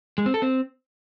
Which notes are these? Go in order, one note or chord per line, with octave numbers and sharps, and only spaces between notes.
G#3
C4
A4
C4